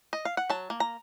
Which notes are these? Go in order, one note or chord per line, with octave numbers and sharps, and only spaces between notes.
D#5
F5
F#5
F#3 A5
A#3
A#5